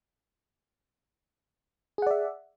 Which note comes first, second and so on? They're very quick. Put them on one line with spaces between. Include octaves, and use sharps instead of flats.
G#4 F#5 D5 E5